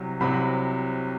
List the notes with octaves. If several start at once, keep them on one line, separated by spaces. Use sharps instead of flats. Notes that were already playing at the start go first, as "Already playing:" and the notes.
Already playing: C2 C3 F#3
C2 C3 F#3 B5